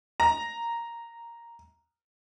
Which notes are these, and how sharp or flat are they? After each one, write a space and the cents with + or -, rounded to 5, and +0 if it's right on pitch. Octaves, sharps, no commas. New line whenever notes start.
A#5 -5